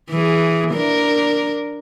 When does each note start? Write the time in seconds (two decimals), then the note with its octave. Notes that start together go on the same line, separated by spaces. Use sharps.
0.10 E3 G#4
0.72 D4 A#4